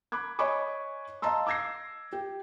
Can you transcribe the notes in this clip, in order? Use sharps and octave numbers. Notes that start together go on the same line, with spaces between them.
B5 D6 F#6 G#6
C#5 D#5 G#5 B5 C#6 D6
D#5 F5 A5 A#5 C6 E6
D6 E6 G#6 A#6 C7
G4